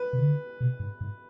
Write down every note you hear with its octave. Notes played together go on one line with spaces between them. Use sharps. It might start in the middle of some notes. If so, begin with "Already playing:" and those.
Already playing: B4
C3
D3
B2
G#2
G#2